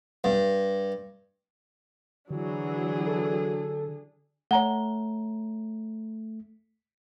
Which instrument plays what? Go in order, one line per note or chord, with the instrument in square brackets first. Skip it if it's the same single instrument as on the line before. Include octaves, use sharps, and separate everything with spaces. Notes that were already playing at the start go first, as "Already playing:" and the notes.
[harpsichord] G2
[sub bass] D3 [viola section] E3 F#3 [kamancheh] D4 G#4
[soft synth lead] A4
[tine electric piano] A3 [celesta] C#5 A#5 G7 [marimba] F#5